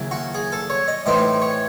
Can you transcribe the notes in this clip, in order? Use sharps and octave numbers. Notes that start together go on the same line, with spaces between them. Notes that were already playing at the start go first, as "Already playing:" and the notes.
Already playing: D#2 C#3 F#3 E4
F#4
G#4
A4
C#5
D#5
A2 E3 C4 D#4 D#5
C#5